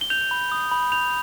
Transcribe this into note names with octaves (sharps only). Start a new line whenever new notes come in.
G7
G6 F7
B5
D#6
B5
G6 F7